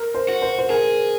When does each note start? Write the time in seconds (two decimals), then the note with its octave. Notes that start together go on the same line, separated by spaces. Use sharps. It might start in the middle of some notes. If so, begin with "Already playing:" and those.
Already playing: A#4
0.14 C5
0.29 F#4
0.42 C5
0.58 C5
0.70 G#4 A#4